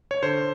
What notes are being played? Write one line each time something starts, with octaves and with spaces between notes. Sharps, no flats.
C#5
D3 C5